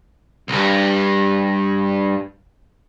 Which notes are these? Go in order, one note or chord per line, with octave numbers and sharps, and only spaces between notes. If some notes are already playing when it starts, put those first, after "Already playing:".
C2 G2